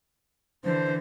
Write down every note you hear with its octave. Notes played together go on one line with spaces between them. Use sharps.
D3 E3 C5